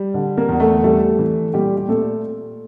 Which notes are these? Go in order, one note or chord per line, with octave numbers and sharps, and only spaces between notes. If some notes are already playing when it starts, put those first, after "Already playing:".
Already playing: G3
D3
A#3 A#4
E2
A3 A4
G3 A3 A4
E3
A#2 G3 G4
G4
A#2 A3 A4